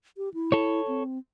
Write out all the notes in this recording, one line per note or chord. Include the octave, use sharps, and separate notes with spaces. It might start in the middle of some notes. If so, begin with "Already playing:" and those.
G4
E4
A4 C#5
C4